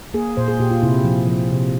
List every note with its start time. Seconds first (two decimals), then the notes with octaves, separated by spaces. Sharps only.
0.14 A#3 G#4
0.37 A#2 C5
0.48 G#4
0.60 A#2 G4
0.71 F4
0.83 C3 E4
1.04 F3
1.27 F3
1.50 C3